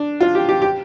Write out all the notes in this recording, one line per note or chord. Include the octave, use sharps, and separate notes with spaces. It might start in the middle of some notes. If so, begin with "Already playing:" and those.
Already playing: D4
F4
G4
G4
G4